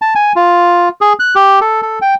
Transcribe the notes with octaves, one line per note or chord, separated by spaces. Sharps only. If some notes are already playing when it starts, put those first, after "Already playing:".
A5
G#5
F4
G#4
F#6
G4
A4
A4
G5